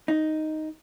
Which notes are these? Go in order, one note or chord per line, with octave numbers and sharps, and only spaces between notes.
D#4